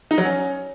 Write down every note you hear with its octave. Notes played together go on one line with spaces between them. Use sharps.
D#4
F#3
C#4